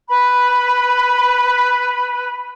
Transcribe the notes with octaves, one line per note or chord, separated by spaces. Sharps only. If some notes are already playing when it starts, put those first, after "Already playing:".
B4 B5